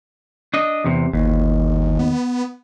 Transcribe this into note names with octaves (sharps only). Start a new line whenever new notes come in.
D4 D#5
E2 C3
G1 D#2
B3